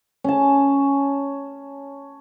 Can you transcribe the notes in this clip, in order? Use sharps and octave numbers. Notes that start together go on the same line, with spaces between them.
C#4 A5